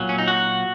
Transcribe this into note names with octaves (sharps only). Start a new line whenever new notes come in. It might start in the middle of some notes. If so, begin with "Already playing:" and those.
Already playing: A#2 F#3
C#4
D#4
F#4